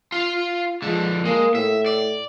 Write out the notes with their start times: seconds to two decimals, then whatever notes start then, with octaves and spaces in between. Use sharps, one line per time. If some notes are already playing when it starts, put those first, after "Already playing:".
0.12 F4 F5
0.82 D3 F3 G#3
1.25 G#3 A#3
1.55 A2 E5
1.86 D5